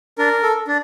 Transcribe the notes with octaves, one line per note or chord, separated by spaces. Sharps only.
D4 A#4
A4
D4